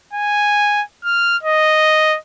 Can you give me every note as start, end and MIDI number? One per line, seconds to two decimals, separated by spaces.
0.13 0.82 80
1.05 1.37 89
1.43 2.17 75